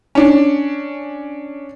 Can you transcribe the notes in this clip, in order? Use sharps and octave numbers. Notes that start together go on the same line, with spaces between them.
C#4 D4